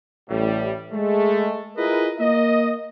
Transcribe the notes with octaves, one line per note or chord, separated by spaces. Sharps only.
A1 A2 G3
G#3 A3
E4 F4 G#4 A#4 B4 D#5
A#3 D#5